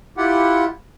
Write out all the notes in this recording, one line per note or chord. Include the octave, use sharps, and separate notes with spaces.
E4 F4 G4 F#5